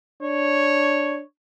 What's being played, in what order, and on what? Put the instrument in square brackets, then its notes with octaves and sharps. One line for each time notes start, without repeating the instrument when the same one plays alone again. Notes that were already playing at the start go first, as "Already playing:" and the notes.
[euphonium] D4 [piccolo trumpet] C#5